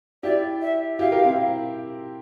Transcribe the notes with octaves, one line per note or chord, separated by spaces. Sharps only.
E4 G4 D5
E5
E4 G4 F5
G4 A#4
C4 E4